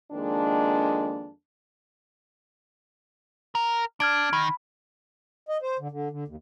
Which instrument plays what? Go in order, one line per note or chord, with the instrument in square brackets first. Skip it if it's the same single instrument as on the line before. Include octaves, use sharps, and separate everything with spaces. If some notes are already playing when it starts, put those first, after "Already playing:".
[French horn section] F2 D#3 G#3 A#3 D4
[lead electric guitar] A#4
[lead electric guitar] D4 [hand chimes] F6 G#6 D7
[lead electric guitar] D#3 [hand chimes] B5
[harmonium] D#5
C5
D3
D3
D3
D#2